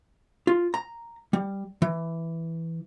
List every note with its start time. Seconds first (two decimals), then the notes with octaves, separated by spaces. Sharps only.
0.47 F4
0.74 A#5
1.33 G3
1.82 E3